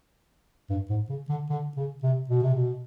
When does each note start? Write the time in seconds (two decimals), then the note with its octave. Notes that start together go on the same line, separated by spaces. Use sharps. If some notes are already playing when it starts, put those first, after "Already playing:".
0.70 G2
0.90 G#2
1.10 C#3
1.29 D3
1.50 D3
1.76 C#3
2.03 C3
2.30 B2
2.43 C3
2.54 B2